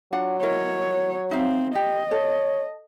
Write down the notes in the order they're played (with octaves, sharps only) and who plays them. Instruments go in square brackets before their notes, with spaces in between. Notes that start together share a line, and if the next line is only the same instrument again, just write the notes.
[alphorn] F#3 [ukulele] D4 F4 F#5
[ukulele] E4 A#4 D#5 [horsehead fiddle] C#5
[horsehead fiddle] C4 [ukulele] D#4 E5 F5
[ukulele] G4 [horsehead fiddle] D#5
[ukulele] A4 [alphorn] C#5